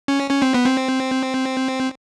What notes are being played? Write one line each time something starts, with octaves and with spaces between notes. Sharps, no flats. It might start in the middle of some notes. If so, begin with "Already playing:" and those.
C#4
C#4
C4
B3
C4